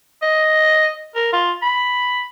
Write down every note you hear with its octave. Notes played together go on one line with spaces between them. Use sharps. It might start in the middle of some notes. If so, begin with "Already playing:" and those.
D#5
A#4
F4
B5